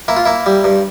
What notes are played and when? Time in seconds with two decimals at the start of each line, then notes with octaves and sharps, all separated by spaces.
0.08 A#3 E4
0.16 F4
0.25 A#3 E4
0.46 G3
0.64 G2